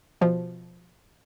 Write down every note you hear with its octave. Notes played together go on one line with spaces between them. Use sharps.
B2 F3